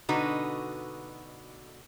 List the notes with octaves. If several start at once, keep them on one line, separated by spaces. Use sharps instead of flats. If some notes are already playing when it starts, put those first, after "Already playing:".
B2 D3 D4 D#4 F#4 B4